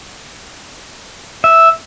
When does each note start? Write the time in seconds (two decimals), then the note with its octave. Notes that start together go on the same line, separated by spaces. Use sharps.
1.44 E5